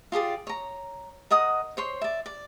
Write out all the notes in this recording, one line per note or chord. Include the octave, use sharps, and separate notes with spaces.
F4 G4 G#4 D5
C#5 A#5
A#4 D#5 F#5 D#6
C5 C#5 C6
D5 E5
D5